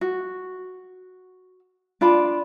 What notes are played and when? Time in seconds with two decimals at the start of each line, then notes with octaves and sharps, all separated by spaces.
0.01 F#4
2.01 D4 F4 D5 B5